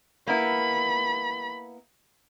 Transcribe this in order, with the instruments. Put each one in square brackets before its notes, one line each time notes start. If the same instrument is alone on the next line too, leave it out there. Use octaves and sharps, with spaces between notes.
[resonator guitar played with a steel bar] A#3 B3 E4 [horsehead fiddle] B5